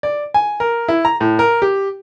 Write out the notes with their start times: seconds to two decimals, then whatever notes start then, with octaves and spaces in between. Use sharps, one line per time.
0.03 D5
0.34 G#5
0.60 A#4
0.88 E4
1.05 A#5
1.21 A2
1.39 A#4
1.62 G4